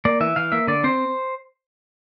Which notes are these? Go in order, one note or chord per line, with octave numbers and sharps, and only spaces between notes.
A#3 D5
E3 E5
E3 F5
A#3 E5
D3 D5
C4 C5